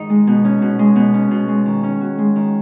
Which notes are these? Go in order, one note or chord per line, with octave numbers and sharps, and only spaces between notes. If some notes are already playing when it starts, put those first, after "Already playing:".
Already playing: G#2 D#3 D#4
G#3
B2
C#4
B2
G#3
B2
C#4
B2
G#3
D#3
C#4
F#4
G#3
D#3